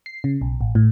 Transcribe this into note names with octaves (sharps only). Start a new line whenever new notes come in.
C7
C#3
B1
A1
A2